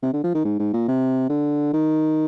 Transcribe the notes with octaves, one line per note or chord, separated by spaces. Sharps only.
C3
D3
F3
D#3
G#2
G#2
A#2
C3
D3
D#3